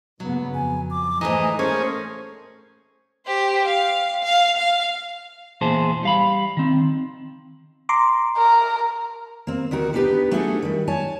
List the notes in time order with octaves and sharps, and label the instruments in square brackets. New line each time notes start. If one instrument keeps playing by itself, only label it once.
[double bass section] G2 C#3 B3 [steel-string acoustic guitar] F#3
[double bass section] F2 [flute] G#5
[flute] D6
[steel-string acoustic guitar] G#2 E3 [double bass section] A3 [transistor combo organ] D#5 [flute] A#5
[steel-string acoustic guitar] A#3 [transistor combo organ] C#4 G#4 [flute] C5
[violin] G4 C5
F5
F5
F5
[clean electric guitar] E2 A#2 E4 G#4 C5 A5
G3 F5 B5
D#3 C4
[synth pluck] A#5 C6 D6
[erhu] A#4
[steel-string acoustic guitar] A#3 C4
D2 D#3 F#4 A#4
B3 D4 D#4 G4 B4
A3 D4 E4 F#4 G#4 A4
D#3 G3
C#5 G#5 A5